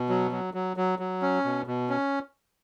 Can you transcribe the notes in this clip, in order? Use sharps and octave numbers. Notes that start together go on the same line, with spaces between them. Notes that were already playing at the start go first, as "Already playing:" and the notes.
Already playing: B2
F#3
F#3
F#3
F#3
F#3
C#4
B2
B2
C#4